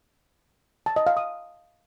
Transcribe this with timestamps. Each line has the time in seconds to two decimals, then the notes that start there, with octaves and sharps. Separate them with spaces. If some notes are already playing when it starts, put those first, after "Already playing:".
0.86 A5
0.96 D#5
1.07 F5
1.17 D#6